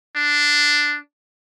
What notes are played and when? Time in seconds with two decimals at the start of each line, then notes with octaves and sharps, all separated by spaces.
0.16 D4